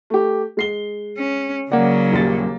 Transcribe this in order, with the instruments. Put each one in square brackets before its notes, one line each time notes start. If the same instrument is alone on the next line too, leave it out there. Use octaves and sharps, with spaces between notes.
[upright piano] A3 G4
G#3 C7 G7
[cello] C#4
[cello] C#3 F#3 [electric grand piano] A#3 D5 [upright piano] F#5
[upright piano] D#1 D#2 A6